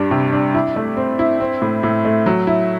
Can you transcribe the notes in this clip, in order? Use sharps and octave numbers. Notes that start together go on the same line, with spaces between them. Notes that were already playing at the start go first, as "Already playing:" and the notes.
Already playing: G2 G3 D4
C3
D4
E4
A3
C4
E4
C4
A2
A2
A3
F#3
E4